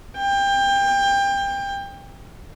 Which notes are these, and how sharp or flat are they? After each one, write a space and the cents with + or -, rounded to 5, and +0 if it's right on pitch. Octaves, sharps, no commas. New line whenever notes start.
G5 +25